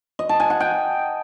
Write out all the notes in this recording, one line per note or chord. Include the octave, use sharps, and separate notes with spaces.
D#5
A5
G#5
F#5
G5